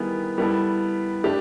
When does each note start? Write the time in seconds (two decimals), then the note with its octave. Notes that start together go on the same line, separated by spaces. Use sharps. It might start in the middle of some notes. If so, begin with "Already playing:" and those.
Already playing: D#3 G3 B3 E4 G#4
0.38 G3 B3 E4 A4
1.24 A3 D4 G4